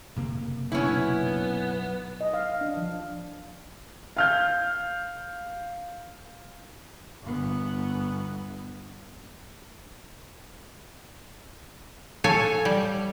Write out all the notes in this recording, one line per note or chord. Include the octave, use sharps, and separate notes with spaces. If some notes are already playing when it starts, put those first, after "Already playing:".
F#1 C3 A#3
B1 B3 C#4 E4
D#5
F5
D4
F3
F5 F6 G6
G1 B3
A4 C#5 F5 G#5
G3